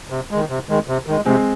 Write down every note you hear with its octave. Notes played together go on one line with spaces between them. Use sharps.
C3
D#3 G#3
C3
D#3 G#3
C3
D#3 G#3
C3 G#3 C4